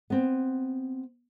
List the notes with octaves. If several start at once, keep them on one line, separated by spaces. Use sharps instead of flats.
B3 C4